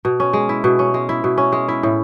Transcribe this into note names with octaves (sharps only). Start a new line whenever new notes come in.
B2
C#4
G#3
E4
B2
C#4
G#3
E4
B2
C#4
G#3
E4
A2